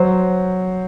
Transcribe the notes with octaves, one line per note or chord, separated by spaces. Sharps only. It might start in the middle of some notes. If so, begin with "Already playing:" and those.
Already playing: F#3 C5